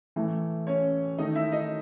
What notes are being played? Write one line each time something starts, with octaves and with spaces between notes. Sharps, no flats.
A2 E3 A3
C#4 C#5
D#3 A3 D#4 D#5
E4 E5
D#4 D#5